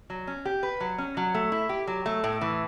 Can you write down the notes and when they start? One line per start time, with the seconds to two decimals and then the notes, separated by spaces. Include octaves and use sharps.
0.10 F#3
0.27 C#4
0.45 G4
0.63 B4
0.80 F#3
0.98 C#4
1.17 F#3
1.34 A3
1.52 E4
1.69 G4
1.87 F#3
2.06 A3
2.24 A2
2.41 E3